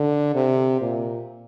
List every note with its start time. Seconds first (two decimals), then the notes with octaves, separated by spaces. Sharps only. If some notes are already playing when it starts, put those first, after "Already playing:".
Already playing: D3
0.35 C3
0.81 A#2